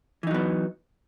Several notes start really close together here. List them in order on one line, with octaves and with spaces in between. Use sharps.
E3 D#4 F#3 B3